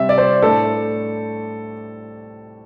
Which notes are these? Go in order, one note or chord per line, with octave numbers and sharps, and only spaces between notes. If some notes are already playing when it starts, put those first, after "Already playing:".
Already playing: C3 G3 C4 E5
D5
C5
A2 A3 D4 A4